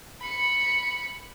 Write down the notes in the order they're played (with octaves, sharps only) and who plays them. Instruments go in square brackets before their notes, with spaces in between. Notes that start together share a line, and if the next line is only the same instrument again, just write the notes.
[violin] B5 C#7